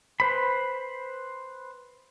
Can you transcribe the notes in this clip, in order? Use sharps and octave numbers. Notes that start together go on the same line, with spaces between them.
B4 C5 B5